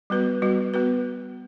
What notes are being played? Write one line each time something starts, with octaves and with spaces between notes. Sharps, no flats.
G3 B3 F#4 B4
G3 B3 F#4 B4
B3 F#4 B4